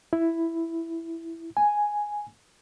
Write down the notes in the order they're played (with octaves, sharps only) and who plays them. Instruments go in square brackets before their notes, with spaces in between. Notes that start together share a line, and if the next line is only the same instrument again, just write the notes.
[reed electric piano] E4
G#5